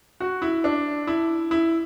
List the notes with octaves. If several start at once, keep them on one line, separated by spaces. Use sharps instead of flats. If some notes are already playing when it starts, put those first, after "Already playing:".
F#4
E4
D4
E4
E4